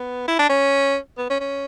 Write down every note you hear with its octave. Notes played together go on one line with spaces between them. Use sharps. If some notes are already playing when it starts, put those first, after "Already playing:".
Already playing: B3
E4
D4
C#4
B3
C#4
C#4